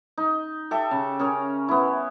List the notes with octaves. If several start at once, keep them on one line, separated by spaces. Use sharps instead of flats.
D#4
G4 A4 E5
C#3
C#4 G#4 A#4
B3 E4